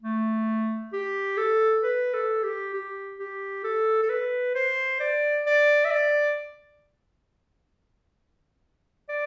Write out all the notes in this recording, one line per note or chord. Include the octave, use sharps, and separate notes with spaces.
A3
G4
A4
B4
A4
G4
G4
G4
A4
A4
B4
C5
D5
D5
E5
D5
D5